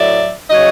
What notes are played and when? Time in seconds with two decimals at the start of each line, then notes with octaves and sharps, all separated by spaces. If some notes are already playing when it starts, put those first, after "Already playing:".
Already playing: A2 F#3 D5 E5
0.50 C#3 F#3 C#5 D#5